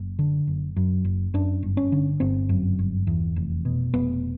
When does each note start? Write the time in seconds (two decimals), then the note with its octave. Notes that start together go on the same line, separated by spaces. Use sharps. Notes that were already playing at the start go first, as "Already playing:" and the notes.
Already playing: F#1
0.19 D3
0.47 F#1
0.77 F#2
1.05 F#1
1.34 F#2 D4
1.63 G1
1.77 C#4
1.92 D3
2.20 G1 C4
2.49 F#2
2.79 G1
3.07 E2
3.36 F1
3.65 B2
3.93 F1 B3